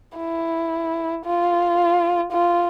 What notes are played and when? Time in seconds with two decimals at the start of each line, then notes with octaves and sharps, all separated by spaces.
0.18 E4
1.25 F4
2.32 F4